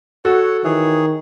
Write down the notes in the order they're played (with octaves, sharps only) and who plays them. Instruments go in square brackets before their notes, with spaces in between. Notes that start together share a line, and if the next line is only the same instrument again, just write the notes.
[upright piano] F#4 [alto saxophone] A4 [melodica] C#5 F#5
[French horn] D#3 [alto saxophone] E3 [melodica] G#4 C#5